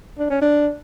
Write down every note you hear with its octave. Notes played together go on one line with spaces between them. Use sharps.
D4
C#4
D4